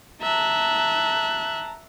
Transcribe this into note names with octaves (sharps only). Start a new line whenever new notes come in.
E5 A5 A#5 F#6